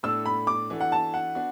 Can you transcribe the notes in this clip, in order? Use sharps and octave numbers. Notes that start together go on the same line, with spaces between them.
A2 A3 D4 A4 E6
B5
D6
E3 D4 F#4 A4
F#5
A5
F#5
B3 D4 F#4